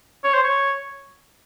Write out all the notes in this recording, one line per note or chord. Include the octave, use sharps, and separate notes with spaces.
C#5
C5
C#5